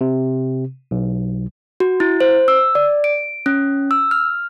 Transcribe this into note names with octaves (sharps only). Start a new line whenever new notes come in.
C3
B1
F#4
E4
C5
E6
D5
D7
C#4
E6
F6